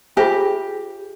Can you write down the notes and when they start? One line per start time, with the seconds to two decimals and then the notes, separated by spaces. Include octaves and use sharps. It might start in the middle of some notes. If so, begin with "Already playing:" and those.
0.17 F4 G4 G#4 C5 E5 G#5